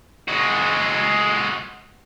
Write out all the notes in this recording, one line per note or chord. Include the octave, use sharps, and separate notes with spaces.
G#3 F#4